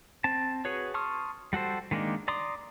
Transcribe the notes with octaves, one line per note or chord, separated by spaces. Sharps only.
C4 A5
F#4 G#4 B4 C#5
A5 C6 C#6 D#6 F6
G3 F#4 A4 C5
D#3 G#3 A#3 D4 D#4
D5 A#5 C6 D6 D#6